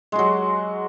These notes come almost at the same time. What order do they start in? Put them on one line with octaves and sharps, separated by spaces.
G#3 F#4 F#3